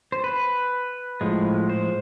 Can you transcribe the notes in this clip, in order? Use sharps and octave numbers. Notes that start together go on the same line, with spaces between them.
C5
B4
A2 F3 G#3
C5